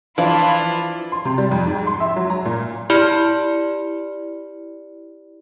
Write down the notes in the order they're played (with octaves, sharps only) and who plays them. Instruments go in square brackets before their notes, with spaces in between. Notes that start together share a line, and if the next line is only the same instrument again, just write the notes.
[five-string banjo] E3 [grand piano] F3 D4 [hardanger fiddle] E4 F4 [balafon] F5
[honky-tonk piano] C6
C3
G3
F2
G#2
C6
E5
F#3
A#5
A#2
[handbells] E4 G4 D5 B5 F6 C#7